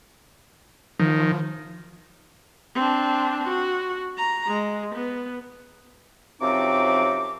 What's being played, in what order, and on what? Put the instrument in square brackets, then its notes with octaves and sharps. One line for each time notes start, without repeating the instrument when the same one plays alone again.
[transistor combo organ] D#3 [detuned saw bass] F3
[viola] C4 D4
F#4
A#5
G#3
B3
[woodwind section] F#2 C3 F3 C4 D#4 D6